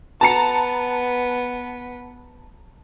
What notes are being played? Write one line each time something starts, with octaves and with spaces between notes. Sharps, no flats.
B3 A5 A#5 C#7